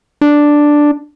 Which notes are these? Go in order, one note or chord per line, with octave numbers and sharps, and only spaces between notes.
D4